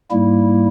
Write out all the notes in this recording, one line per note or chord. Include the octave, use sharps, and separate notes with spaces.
G#2 G3 A#3 E4